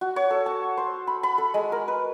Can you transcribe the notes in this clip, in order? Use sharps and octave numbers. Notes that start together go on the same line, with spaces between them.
F#4
C#5
A4
A5
C5
B5
B5
A4
G#3
A#4
B4